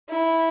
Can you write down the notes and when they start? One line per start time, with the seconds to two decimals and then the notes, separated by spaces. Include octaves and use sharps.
0.09 E4